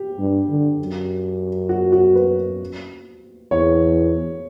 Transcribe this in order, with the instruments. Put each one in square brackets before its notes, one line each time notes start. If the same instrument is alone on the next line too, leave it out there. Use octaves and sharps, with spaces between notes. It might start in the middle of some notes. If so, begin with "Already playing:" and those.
Already playing: [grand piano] G4
[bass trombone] G2
D3
F#2
[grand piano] F#4
F#4
B4
[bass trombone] E2 [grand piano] C#5